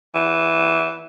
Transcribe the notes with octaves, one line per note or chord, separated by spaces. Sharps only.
E3